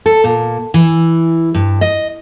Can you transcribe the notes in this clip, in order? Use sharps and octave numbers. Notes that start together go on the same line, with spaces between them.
A4
A#2
E3
G2
D#5